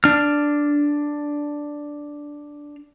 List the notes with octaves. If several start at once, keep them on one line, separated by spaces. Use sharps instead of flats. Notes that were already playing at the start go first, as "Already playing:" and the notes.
D4 F6